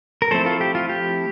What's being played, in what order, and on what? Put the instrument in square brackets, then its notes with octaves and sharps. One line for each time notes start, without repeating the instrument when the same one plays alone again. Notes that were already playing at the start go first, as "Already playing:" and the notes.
[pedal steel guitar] A#4
F3 A3 C4 E4 A4 C5
F4 A4
G4
F4
G4